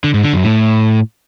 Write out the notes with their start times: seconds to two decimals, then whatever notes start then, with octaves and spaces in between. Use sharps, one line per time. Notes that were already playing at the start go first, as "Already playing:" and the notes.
0.04 D3
0.14 G#2
0.24 D3
0.33 F#2
0.43 A2